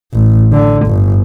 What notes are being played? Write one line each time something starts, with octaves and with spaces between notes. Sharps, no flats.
A1
D3
G1